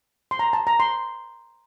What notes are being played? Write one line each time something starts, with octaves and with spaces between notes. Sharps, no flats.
C6
A#5
A5
A#5
C6